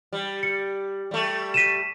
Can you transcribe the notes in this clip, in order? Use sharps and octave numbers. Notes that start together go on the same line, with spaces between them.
G3
C#7
G3 A3
B6 D#7 E7